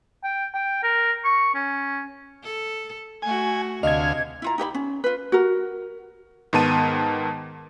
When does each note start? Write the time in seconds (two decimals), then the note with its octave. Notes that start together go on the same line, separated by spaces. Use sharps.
0.24 G5
0.54 G5
0.83 A#4
1.25 C#6
1.55 C#4
2.43 A4
3.22 A3 F#4 G#5
3.83 D2 C3 D#5 F5 G#6
4.42 E4 F4 A#5
4.58 D#4 G4 C#5 B5
4.75 C#4
5.04 F4 B4
5.32 F#4 A#4
6.53 G#2 D#3 B3 A5 D#7